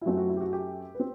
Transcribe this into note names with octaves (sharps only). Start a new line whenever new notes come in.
E4
F#2 F#3 A3 C4 F#4
F#4
E4
G4
F#4
G4
B4
C4